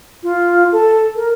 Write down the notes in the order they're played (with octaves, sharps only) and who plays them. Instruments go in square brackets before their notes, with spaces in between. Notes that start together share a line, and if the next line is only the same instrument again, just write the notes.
[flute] F4
A4
A#4